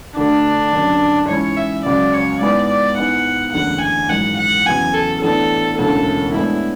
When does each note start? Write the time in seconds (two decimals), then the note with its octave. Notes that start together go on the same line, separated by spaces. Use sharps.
0.17 D2 D3 A3 D4
0.72 F#1 F#2 D3
1.29 G#2 E3 G#3 C#4 E4 C#5
1.57 E5
1.85 C#2 C#3 F#3 C#4 D5
2.13 C#5
2.41 G#2 G#3 B3 E4 D5
2.69 D5
2.97 G#2 G#3 B3 E4 F#5
3.53 F#1 E2 D3 A3 E4 F#5
3.82 G#5
4.09 G#1 F#2 E3 G#3 F#5
4.38 F#5
4.66 E2 C#3 F#3 B3 G#5
4.94 A4
5.22 A2 E3 B3 D4 A4
5.78 E1 D2 C#3 E3 A4
6.34 A2 G#3 B3 D4 E4